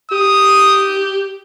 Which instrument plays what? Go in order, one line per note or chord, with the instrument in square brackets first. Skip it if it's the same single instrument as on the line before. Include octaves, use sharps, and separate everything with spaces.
[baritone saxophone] G4 [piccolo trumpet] D#6